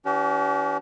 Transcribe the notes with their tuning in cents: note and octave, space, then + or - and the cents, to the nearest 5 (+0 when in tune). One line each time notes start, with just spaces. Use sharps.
E3 +0 C#4 +45 G4 -40